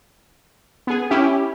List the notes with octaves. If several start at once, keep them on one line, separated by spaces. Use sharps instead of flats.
B3 G#4
C#4 E4 G4